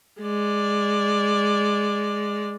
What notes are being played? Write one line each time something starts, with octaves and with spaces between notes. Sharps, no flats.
G#3 D5